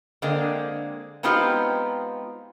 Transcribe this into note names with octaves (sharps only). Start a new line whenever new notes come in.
D3 G#3 A#3 C4
G#3 B3 C4 D#4 F4 G4